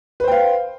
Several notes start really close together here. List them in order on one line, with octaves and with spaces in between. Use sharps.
B4 C5 G5 F5